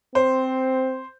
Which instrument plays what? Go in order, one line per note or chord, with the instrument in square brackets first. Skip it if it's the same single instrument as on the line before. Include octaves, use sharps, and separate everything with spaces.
[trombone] C4 [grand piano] C5